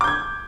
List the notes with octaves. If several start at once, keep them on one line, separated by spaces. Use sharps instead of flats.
D6 G6 G#6